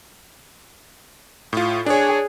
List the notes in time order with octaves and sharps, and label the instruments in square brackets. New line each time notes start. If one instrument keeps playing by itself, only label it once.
[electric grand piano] A2 F4
[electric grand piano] D4 C#5 [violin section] G#4